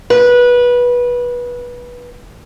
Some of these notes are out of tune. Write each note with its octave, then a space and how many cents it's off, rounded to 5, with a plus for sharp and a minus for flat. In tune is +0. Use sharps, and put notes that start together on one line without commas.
B4 -20